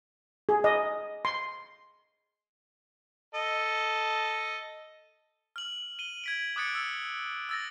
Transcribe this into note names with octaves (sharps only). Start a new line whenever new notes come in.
G#4
D#5
C6
A4 D#5
F6 F#7
D#7 G7
G#6 B6 D7
D6 D#6 F#6 A6 C#7 D7
E6
E6 A6 A#6